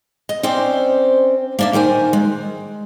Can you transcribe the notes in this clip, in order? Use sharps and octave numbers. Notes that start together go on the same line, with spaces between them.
D#5
C4 C#4 C5 D5
A#3 D4 E5
D#3 A#4 C5 G#5
G#3